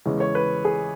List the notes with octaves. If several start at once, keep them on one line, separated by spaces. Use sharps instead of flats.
E2 C#3 G#3 C#4
C#5
B4
G#4